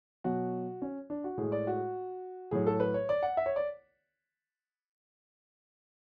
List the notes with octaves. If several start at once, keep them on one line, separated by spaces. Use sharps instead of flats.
B2 F#3 F#4
C#4
D4
F#4
A2 G#4
G#3
D5
F#4
A2 F#3 G#4
A4
B4
C#5
D5
F#5
E5
C#5
D5